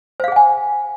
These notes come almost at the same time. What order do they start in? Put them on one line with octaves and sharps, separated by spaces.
C5 F5 G#4 F#5 G#5